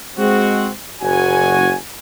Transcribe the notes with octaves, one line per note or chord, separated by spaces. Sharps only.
G#3 C4 F#4
F#1 F#4 G#5